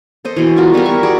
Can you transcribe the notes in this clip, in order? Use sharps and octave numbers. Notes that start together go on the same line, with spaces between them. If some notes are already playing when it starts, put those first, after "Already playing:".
A4 C5 D#5
B2 E3
F4 F#4 A#4
G3 B3 E4 A#4
E5 C#6
F#4 G#4 D5